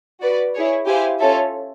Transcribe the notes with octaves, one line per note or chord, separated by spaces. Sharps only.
F#4 B4 D5
E4 G#4 C#5
E4 G4 C5 F5 G#5
C#4 F4 A4 C#5 E5